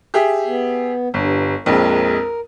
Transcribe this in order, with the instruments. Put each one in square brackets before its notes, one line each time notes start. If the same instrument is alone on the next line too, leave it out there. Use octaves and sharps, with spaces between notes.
[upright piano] G4 G#4 E5
[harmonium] B3
[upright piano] G1 [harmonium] G2
[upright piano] A#1 F2 G#3 [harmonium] A#4